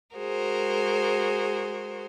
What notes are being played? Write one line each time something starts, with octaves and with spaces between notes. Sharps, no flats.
G#3 F#4 G#4 A#4 C5